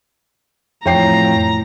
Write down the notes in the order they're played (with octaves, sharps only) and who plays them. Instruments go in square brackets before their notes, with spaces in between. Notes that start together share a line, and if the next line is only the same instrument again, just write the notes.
[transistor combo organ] F2 [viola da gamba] A2 E3 [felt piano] C#5 G5 C7 [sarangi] A#5